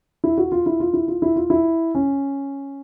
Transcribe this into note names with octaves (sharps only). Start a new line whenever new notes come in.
E4
F#4
F4
E4
F4
E4
F4
E4
F4
E4
C#4